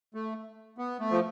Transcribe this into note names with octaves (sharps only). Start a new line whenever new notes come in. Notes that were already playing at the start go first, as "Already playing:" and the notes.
A3
B3
A3
F3